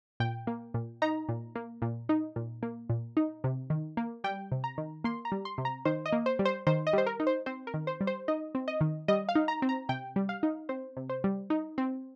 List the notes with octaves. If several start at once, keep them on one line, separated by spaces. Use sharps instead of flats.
A#2 G5
A#3
A#2
D#4 A#5
A#2
A#3
A#2
D#4
A#2
A#3
A#2
D#4
C3
D#3
A#3
G3 G5
C3
A#5
D#3
A#3 C6
A#5
G3
C6
C3
A#5
D#3 C5
D#5
A#3
C5
G3
C5
D#3 C5
D#5
G3 C5
A#4
D#4
C5
C4 C5
A#4
D#3
C5
G3
C5
D#4 D#5
C4
D#5
D#3
G3 D#5
F5
D#4
A#5
C4
A#5
C3 G5
G3
F5
D#4
C4 C5
C3
C5
G3
D#4
C4